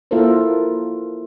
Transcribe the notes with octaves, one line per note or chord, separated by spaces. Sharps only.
A#3 E4 F4 A4 A#4 C5